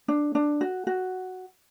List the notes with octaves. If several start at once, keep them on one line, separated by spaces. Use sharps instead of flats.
D4
D4
F#4
F#4